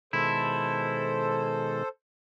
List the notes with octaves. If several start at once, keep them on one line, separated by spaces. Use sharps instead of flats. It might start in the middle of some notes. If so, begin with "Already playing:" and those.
B2 D#3 G#3 E4 A4 C5